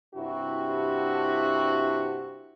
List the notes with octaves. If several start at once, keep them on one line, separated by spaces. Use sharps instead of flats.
G2 C3 D4 E4 F#4